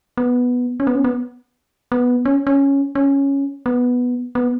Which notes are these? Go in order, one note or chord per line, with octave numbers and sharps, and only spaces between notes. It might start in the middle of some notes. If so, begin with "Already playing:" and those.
B3
C#4
B3
C#4
B3
B3
C#4
C#4
C#4
B3
B3